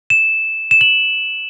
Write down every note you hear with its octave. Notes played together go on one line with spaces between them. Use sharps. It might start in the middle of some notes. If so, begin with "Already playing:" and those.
E7
E7
F#7